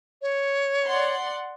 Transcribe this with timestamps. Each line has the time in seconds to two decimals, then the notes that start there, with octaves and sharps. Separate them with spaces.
0.22 C#5
0.87 D5 F#5 C6